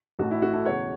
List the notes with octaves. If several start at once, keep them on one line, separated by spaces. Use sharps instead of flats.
A1 A2 A3 F#4
E4
F#4
E4 A4
E1 E2 C#3 C#5 F#5